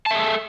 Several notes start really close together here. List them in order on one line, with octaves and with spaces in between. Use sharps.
A5 E5 G#4 A4